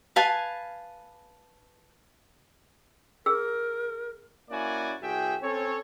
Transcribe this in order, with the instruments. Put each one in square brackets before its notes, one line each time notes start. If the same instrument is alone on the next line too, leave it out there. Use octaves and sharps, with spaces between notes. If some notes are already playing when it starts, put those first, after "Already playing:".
[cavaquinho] B4 F5 G#5 A5
[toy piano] G#4 E6 [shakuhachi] A#4
[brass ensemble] A#3 C#4 E4 F#4 D5 G#5
C2 F#4 G#4 E5 G5
C4 C#4 A4 C#5